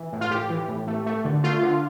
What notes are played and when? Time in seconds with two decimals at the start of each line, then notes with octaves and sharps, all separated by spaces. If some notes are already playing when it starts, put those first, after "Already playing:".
Already playing: E3
0.12 A2
0.21 F4
0.30 A2 G4
0.50 E3
0.69 A2
0.87 A3
1.06 A3
1.25 D3
1.44 A3 F4
1.63 D3